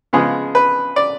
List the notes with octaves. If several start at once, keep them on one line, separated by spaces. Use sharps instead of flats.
C#3 F3 G#3 B3 G#4
B4
D5